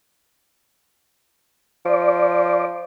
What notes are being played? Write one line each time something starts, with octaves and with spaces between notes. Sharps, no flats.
F3 D5